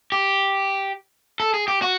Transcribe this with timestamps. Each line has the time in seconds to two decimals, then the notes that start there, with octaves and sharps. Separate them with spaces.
0.12 G4
1.40 A4
1.54 G#4
1.68 G4
1.82 F#4